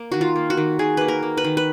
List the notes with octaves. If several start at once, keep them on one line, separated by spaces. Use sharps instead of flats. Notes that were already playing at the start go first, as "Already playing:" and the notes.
Already playing: A#3
D#3 F#4
F4
A#3
F#4
D#3
D#3 G#4
A#3 B4
A#4
A#3
B4
D#3
B4